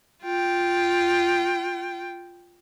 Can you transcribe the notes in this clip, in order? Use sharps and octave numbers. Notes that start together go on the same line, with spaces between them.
F4 G5